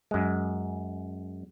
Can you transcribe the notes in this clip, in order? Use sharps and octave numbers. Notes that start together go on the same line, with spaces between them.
F#2 G#3